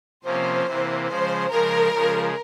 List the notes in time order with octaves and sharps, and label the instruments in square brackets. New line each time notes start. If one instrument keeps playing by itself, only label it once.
[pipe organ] C3 F3 A#3 C#4 [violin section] C5
[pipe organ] C3 E3 A#3
[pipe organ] C#3 F3 G#3 [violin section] C5
[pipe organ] C#3 F3 G#3 [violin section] A#4
[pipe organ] C#3 F3 G#3